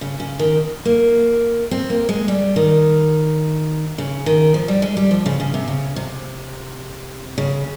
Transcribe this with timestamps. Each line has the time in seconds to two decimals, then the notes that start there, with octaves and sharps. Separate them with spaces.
0.01 C#3
0.20 C#3
0.39 D#3
0.85 A#3
1.71 C4
1.90 A#3
2.09 G#3
2.28 G3
2.56 D#3
3.98 C#3
4.26 D#3
4.54 F3
4.68 G3
4.82 G#3
4.97 G3
5.11 F3
5.26 C#3
5.40 C#3
5.54 C3
5.68 C#3
5.96 C3
7.38 C#3